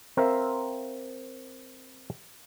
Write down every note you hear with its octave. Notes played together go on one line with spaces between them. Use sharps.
C4 A#4 C5 E5 F5